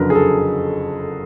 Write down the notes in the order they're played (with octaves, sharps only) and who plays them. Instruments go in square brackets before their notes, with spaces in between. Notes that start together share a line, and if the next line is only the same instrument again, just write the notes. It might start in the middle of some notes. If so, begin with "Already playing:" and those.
Already playing: [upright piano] F#1 F2 D3 F#3 [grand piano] A#4 B4
[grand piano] G#4
A4